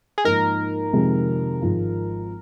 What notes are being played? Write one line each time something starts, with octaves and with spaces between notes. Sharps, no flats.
G#4
G#2 F3 A#3 D#4 A#4
F2 C3 D#3 G#3
G#1 G#2 F3 G#3 F4